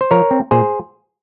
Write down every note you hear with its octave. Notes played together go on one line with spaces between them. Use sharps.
C5
F3 A#4 C#5
C4
A#2 G#4 C5